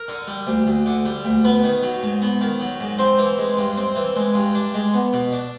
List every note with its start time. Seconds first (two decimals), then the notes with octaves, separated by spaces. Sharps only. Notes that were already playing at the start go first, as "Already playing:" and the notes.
Already playing: A#4
0.08 D3
0.27 G3
0.47 D2
0.67 D2
0.86 D3
1.06 G3
1.25 D2
1.44 B3 B4
1.64 D#3
1.83 F#3
2.03 G#2
2.22 B3
2.41 D#3
2.60 F#3
2.80 G#2
2.99 C4 C5
3.18 E3
3.38 G#3
3.57 G2
3.77 C4
3.96 E3
4.16 G#3
4.34 G2
4.54 D4
4.74 G#3
4.94 B3
5.13 B2
5.32 D4